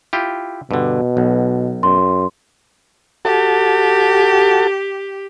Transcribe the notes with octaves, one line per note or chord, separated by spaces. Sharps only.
E4 F4 G4
G2 B2 D3
B1
F#2 C6
F#4 G4 A4 A5